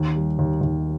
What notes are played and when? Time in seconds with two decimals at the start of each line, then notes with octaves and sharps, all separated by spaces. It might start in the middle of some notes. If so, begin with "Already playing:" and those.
Already playing: D#2
0.15 G3
0.39 D#2
0.61 D#2